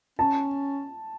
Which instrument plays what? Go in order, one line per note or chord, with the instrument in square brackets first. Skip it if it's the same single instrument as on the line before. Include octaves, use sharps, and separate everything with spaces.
[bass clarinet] C#4 [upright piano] A5